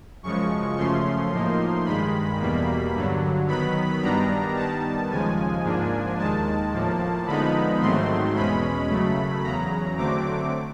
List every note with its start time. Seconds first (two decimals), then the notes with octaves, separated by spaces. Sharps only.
0.23 F#2 C#3 F3 G#3 C#6
0.77 F#2 C#3 F3 A3 C#4 C6
1.32 A2 F3 A#3 D#4
1.85 G2 D#3 G#3 B5
2.39 E2 B2 G3 A#3
2.94 G2 D3 F#3
3.48 D#3 F#3 B3 B5
4.02 G2 D#3 G3 B3 D4 A#5
4.56 D#3 G3 B3 A5
5.10 D#2 C#3 F3 G#3 G#5
5.64 G#2 F3 A#3 D4
6.18 D#2 D#3 G#3 A5
6.73 A2 F3 A#3
7.26 D3 F3 G#3 B3 D#4 B5
7.81 G#2 D#3 F#3 A3 C4 C6
8.35 E2 B2 G#3 C#4 B5
8.89 F#2 C#3 F#3 A3
9.43 E2 C#3 F#3 A#5
9.97 D3 F#3 A3 C4 D6